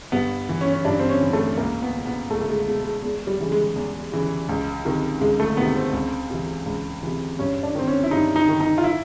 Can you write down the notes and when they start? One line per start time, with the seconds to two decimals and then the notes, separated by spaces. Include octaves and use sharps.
0.12 G2 B3
0.49 E3
0.61 C#4
0.73 C#4
0.85 G2 D4
0.99 C4
1.09 C#4
1.21 E3
1.33 A3
1.58 C#2 A#3
1.82 B3
1.95 B2
2.06 B3
2.31 C#2 A3
2.41 A3
2.49 G#3
2.67 B2 G#3
2.84 G#3
3.03 E2 G#3
3.27 G3
3.40 C#3 E3
3.52 G#3
3.76 E2
4.12 C#3 E3
4.49 C#2
4.85 C3 D#3
5.21 C#2 G#3
5.40 A3
5.57 C3 D#3 B3
5.76 C4
5.93 C#2
6.31 C3 E3
6.66 C#2
7.03 C3 E3
7.39 G2 C#4
7.63 D4
7.75 D#3 C4
7.87 C#4
8.03 E4
8.11 G2 D#4
8.36 D#4
8.49 D#3
8.60 D#4
8.78 F4
8.84 E4